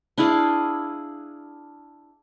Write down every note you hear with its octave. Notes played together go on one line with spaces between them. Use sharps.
D4 E4 G#4 F5